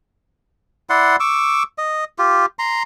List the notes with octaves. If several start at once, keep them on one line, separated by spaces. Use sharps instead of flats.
E4 D5 F#5 C6
C#6 D6 E6
D#5
F4 G4
A#5 C6